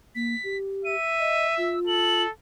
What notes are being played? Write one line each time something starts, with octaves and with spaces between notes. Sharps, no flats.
A#3 B6
G4
E5 D#7
D#5
F4 E6
A4 F#7